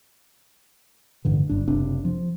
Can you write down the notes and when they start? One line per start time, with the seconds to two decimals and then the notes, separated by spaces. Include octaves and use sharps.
1.25 A1 G2 D3 E3
1.49 G1 G2 D4
1.68 F#1 C3 C4 D4
2.05 F3